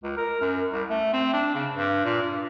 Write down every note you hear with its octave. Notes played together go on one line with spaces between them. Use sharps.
C#2
A#4
F#2
C2
A3
C4
D4
C#3
G2
A#2
G2